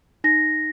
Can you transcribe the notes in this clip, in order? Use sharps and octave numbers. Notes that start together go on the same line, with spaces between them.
D#4 A#6